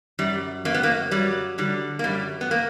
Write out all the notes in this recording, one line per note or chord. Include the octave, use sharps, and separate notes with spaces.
F#2 G3
F#2 A#3
B3
A#3
F#3 G3
D3 G3
A#3
F#2 G3
B3
A#3